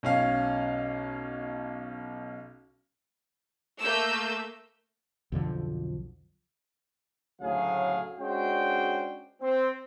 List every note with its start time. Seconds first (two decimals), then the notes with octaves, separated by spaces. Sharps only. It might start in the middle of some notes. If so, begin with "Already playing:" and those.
0.03 B1 C#4 F5
3.81 A3 A#3 E6 G6
5.32 B1 F2 D3 F3
7.42 D2 A2 C#3 F#3 G#4 F5
8.20 G#3 C#4 D4 F#4 C5 G5
9.42 C4